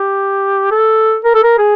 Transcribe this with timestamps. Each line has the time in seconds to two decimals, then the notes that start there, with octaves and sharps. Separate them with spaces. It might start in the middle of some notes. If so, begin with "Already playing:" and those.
Already playing: G4
0.71 A4
1.25 A#4
1.34 A4
1.43 A#4
1.58 G#4